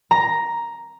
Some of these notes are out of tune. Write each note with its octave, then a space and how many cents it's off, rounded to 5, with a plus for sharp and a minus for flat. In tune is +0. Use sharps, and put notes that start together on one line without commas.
A#5 +5